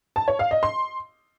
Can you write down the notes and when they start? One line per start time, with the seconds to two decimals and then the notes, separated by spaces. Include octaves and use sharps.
0.16 A5
0.28 C#5
0.39 F5
0.51 D#5
0.63 C6